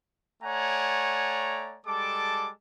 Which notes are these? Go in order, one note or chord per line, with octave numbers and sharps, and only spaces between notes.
A3 C#5 D5 F#5 G#5 A#5
G3 G#3 A4 A5 D6